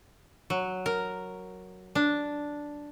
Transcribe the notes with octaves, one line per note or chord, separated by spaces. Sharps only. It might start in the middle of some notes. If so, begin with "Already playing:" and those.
F#3
A#4
D4